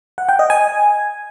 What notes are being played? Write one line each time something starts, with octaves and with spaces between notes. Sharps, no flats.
F#5
G5
D#5
G#5